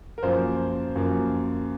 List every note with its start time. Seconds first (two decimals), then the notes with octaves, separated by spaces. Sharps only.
0.18 A#4
0.23 F#2 F3 A#3 C5
0.96 F#2 F3 A#3